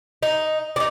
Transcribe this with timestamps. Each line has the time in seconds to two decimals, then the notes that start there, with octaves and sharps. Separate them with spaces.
0.23 D#4
0.76 D4 D#4